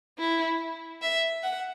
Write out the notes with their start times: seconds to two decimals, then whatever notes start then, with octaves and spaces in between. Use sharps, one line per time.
0.19 E4
1.02 E5
1.43 F#5